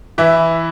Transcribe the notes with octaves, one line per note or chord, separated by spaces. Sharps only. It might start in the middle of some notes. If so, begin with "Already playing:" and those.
E3 E4